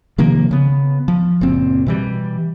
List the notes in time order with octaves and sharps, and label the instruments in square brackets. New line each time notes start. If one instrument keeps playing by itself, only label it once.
[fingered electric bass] C3 D#3 F3 A#3
C#3 B3
F3
F#1 A#2 C4
B2 E3 G3